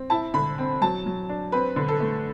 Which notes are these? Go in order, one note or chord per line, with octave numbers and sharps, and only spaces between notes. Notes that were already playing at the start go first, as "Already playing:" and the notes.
Already playing: C4
E4 A5
D3 B5
C4
F#3 A5
F#3
D4
C4 B4
D3
A4
A3